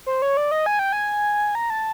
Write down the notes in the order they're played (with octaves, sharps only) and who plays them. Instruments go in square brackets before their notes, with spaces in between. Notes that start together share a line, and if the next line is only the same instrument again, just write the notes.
[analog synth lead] C5
C#5
D5
D#5
G#5
G5
G#5
A#5
A5